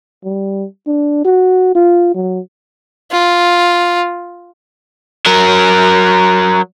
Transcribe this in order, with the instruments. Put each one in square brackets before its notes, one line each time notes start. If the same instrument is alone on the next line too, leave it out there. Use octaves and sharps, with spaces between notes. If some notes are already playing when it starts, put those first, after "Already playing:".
[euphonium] G3
D4
F#4
F4
F#3
[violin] F4
[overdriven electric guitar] F#3 A#4